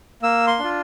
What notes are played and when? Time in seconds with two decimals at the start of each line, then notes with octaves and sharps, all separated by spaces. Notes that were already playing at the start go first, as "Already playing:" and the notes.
0.23 A#3 E6
0.47 C6
0.59 D4 F4